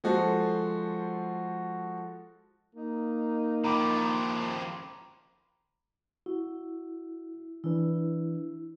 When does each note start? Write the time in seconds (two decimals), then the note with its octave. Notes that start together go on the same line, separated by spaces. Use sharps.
0.04 F3 G#3 F#4 A4 C5
2.75 A#3 D#4
3.64 D#3 F3 A#5 B5 D6
6.26 E4 F#4
7.64 E3 D4 E4 B4